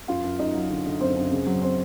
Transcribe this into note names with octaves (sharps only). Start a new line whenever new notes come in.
F#2 F4 F5
F#2
F#2 D#4 D#5
F#3
D3
D3
F#2 C4 C5
F#2
C#3
F#3
C4 C5